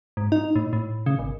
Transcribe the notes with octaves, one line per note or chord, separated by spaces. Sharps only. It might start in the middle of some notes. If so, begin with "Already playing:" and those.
G#2
D#4
A2
A2
C#3
G#1